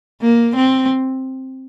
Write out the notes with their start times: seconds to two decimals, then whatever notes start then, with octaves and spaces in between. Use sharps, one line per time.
0.21 A#3
0.56 C4